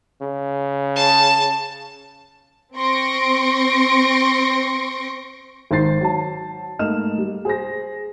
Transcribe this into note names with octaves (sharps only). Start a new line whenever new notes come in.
C#3
A5
C4 C6 C#6 A#6 D7
G#1 D#3 C5 A6 C7
F#3 A5
G#2 A3 A#3 D#5 F6 E7
G3
G#4 C5 A#6